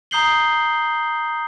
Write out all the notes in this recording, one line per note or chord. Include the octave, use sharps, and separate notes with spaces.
A#5 D#6 G6 C7 F#7 G7